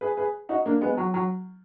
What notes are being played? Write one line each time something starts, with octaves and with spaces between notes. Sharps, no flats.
G#4 B4
G#4 B4
D#4 F#4
A#3 D4
G#3 B3
F#3
F#3